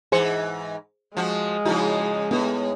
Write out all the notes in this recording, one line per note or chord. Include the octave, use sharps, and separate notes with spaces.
G#2 E3 G#4 C5 C#7
F3 G#3 F#4
C#3 F3 D#4 E4 F#4
A2 B3